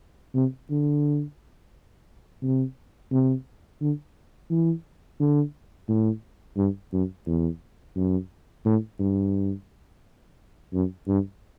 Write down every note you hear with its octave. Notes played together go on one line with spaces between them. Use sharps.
C3
D3
C3
C3
D3
E3
D3
A2
G2
F#2
E2
F#2
A2
G2
F#2
G2